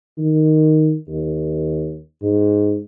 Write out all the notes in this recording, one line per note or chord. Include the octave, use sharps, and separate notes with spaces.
D#3
D#2
G#2